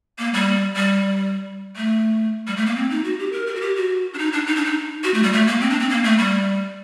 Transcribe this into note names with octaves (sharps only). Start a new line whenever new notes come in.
A#3
G3
G3
A3
G3
A3
A#3
C4
D#4
F#4
G4
A#4
A#4
F#4
G4
F#4
D4
D#4
D4
D#4
D4
D#4
F#4
A3
G3
A3
A#3
C4
D4
C4
A#3
A3
G3